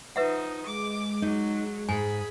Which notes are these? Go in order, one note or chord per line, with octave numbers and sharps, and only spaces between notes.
F3 D#4 B4 E5 F#5
G#3 D6
F#3 D#4
G#2 G#4 G#5 B5